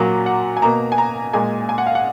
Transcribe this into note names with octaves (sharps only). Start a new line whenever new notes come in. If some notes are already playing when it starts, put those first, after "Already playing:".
Already playing: A#2 F#3 A#3 A#5
F#5
G#5
B2 A#3 A#5
G#5
A#5
A#2 G#3 G#5
G#5
F#5
F5
F#5